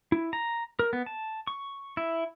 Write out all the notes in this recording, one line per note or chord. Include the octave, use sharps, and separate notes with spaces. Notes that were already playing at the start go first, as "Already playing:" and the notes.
E4
A#5
A#4
B3
A5
C#6
E4